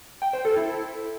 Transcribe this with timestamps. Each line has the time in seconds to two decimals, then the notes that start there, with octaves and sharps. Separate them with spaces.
0.22 G5
0.33 C5
0.45 A4
0.57 E4